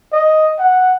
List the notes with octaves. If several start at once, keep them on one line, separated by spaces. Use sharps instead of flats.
D#5
F#5